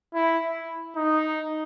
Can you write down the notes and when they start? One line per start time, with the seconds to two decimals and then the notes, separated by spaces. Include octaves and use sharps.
0.14 E4
0.96 D#4